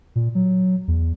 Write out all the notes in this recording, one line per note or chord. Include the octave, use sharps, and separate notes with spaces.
A#2
F#3
E2